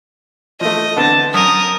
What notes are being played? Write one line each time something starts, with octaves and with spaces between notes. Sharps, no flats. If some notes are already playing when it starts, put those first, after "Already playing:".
F3 A3 D#5
D3 B3 C4 A5
F#2 A#4 D#6